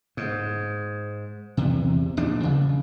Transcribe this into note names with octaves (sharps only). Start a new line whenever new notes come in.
G#2
E2 C3
A#1 D#2 D4
C#3